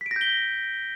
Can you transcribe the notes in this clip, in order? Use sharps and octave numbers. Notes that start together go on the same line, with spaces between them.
B6
D7
A#6
G6
G7